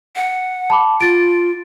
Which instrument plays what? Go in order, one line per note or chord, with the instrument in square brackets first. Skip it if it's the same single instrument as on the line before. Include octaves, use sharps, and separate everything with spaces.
[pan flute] F#5
[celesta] A5 B5 D6
[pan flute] F4 [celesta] A6 D7